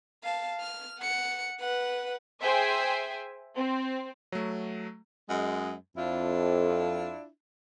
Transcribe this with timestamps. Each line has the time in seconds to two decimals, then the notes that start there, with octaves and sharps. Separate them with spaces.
0.24 F5 A5
0.60 F6
0.99 F#5 C#7
1.60 B4 F#5
2.42 G#4 C5 E5 G5 G#5
3.56 C4
4.32 F#3 A3
5.29 F#2 G#3
5.97 F2 D4 E4 F4